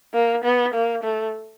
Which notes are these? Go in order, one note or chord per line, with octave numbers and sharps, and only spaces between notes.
A#3
B3
A#3
A3